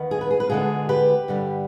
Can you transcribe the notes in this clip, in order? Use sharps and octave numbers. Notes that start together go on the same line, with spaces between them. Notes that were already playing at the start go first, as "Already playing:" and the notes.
Already playing: D#2 D#3 B3
G#4
B4
G#4
B4
D2 D3 G#3 B3 F4 G#4
G4 B4
G2 D3 G3